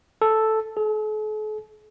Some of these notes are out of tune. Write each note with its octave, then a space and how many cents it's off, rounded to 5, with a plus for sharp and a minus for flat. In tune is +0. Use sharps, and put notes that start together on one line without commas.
A4 +0
A4 -45